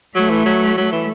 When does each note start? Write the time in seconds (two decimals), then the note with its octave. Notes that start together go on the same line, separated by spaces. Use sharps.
0.15 F#3 A3
0.30 E3
0.46 F#3
0.77 F#3 A3
0.92 E3